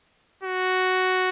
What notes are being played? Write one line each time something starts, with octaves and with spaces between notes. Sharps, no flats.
F#4